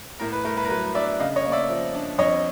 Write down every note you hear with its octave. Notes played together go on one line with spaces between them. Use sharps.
A2 A#4
B4
A3 A#4
B4
A#4
F#3 B4
D4 D5 E5
C#3 D#5 F5
C#5 D#5
A#3
D5 E5
F3
D4
F2 C#5 D#5